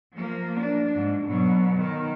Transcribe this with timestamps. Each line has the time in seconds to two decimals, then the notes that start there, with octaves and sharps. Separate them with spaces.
0.14 F3 A#3
0.60 D4
0.95 G#2
1.27 B2 F#3
1.77 D#3